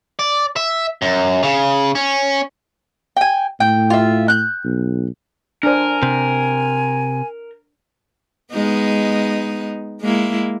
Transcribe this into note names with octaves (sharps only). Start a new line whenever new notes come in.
D5
E5
F#2
C#3
C#4
G5 G#5
A2 G5
F4 E5
F#6 G6
B1
D4 A#4 C5 G#5
C3
G#3 B3 D#4
G#3 A#3 E4